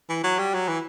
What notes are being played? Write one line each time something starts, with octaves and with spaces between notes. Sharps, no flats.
E3
F#3
G3
F#3
E3